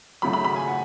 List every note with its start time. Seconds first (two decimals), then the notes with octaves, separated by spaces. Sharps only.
0.22 G#1 F#2 C#3 F#3 A3 B5
0.33 B5
0.45 B5
0.56 G#5
0.67 F#5